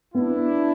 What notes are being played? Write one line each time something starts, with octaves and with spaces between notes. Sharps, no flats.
B3 D4 E4